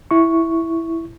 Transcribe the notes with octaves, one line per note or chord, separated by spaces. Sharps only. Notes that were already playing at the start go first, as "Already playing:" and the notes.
E4 C#6